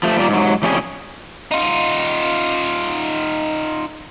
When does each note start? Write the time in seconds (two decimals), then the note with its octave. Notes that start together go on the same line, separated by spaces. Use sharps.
0.03 F3 A3
0.18 A#2 G3 A#3
0.29 G#2 F#3
0.63 F2 A2 G3 C#4 F4 G#4
1.51 D#4 F4